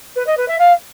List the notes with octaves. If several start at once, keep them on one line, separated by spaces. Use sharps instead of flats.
B4
D#5
B4
E5
F5